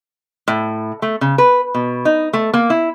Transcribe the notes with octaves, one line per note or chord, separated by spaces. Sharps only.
A2
A3
C#3
B4
B2
D#4
A3
A#3
E4